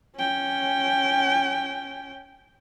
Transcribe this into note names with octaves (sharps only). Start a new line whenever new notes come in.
C#4 G5